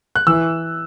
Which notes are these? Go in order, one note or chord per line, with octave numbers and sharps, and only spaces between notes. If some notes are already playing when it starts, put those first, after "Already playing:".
F#6
E3 E6